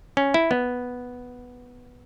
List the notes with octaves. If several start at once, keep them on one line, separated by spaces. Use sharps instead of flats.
C#4
E4
B3